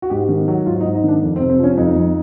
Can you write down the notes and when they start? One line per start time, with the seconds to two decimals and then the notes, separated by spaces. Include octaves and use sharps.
0.02 F#4
0.10 G#2 G4
0.29 D#3
0.48 F#3
0.66 G#2 F4
0.81 D#4
0.85 G#2
0.95 D#4
1.04 D#3 D4
1.22 F2
1.36 C4
1.40 C3
1.50 C4
1.59 F3 C#4
1.77 F2 D#4
1.96 F2